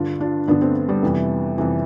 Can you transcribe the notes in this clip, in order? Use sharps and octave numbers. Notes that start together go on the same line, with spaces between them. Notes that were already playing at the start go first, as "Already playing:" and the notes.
Already playing: G2 D3 D4 F4
D4 F4
G2 D3 B3 D4
A3 C4
G3 B3
F2 C3 E3
F2 C3 E3